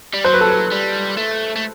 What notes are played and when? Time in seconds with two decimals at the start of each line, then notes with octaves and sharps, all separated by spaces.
0.13 G3
0.24 F#3 C5
0.33 B4
0.41 A4
0.50 B4
0.71 G3
1.18 A3
1.56 A3